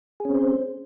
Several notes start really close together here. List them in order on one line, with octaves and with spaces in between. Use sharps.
G#4 C#4 C4 C5